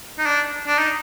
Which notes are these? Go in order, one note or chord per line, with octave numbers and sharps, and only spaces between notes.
D#4
D4
D4
D#4